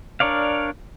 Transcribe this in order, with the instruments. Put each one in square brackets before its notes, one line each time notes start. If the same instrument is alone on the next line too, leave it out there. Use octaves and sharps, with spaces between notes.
[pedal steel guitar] D4 A#4 C#5 D5 F5